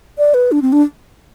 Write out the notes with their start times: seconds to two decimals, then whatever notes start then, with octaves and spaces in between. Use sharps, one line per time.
0.18 D5
0.34 B4
0.52 D4
0.62 C4
0.72 D4